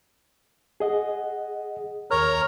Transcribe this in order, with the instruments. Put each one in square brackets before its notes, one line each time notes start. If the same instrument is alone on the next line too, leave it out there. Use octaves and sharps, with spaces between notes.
[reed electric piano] G#4 D#5 F#5
[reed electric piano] D#2 F6 [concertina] A#4 C#5 A#5